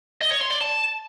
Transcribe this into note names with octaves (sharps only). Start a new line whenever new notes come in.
D#5
C#5
C6
D5
A5